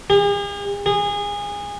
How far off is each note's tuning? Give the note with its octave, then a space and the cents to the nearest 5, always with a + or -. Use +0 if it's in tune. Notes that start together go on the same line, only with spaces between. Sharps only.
G#4 -45
G#4 -25